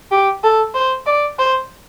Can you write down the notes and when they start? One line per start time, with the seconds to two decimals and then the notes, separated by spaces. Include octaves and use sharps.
0.11 G4
0.44 A4
0.74 C5
1.06 D5
1.39 C5